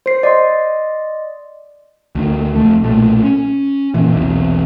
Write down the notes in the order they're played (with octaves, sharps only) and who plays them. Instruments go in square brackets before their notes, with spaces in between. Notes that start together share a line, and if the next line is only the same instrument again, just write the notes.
[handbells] C5 C7
D5 D#5 C6
[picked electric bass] D2 D#3
F1 A3
B1 A#2 A3
C#4
F#1 A#2 E3
B1 E2 C3